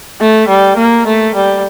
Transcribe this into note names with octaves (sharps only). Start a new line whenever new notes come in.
A3
G3
A#3
A3
G3